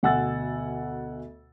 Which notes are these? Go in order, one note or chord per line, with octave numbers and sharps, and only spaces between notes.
D2 B2 F#5 G#5 E6 A6